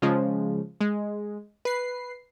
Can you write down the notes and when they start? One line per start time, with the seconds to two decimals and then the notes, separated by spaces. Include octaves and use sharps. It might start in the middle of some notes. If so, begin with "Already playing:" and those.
0.02 C#3 F3 G#3
0.81 G#3
1.65 B4 C7